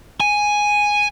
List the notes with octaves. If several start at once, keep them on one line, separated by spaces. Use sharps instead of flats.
G#5